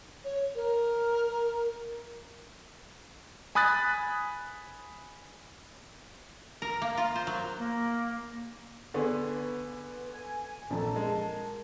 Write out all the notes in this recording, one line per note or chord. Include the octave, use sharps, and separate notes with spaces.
C#5
A#4
G#5 B5 D#6 F#6 A6
A#4
A#3
F4
C5
F#3
A#3
D3 B3 D4 G#4 C6 C#6
B4
G#5
A#1 F2 A4 A5 A#5
G#3 A#4